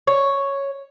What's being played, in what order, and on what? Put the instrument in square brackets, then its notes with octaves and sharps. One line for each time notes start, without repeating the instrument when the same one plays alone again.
[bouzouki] C#5